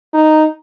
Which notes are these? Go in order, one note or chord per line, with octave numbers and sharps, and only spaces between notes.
D#4